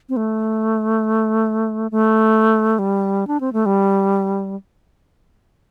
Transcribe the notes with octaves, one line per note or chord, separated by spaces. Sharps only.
C4
A3
A3
G3
D4
C4
A3
G3